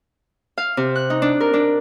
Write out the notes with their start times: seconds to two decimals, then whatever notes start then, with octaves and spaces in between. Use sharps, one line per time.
0.58 F5
0.77 C3
0.96 F#6
1.10 D#4
1.22 D4
1.41 A#4
1.54 D4